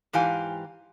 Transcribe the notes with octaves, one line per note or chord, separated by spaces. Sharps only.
G#2 E3 G4 F5 G#5